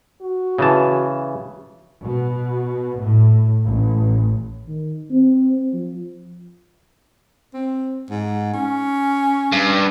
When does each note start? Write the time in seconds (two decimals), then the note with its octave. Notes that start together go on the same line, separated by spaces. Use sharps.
0.21 F#4
0.58 C#3 E3 A5
2.04 B2
3.01 A2
3.64 A1
4.68 D#3
5.11 C4
5.74 F3
7.54 C4
8.10 G#2
8.54 C#4
9.53 G2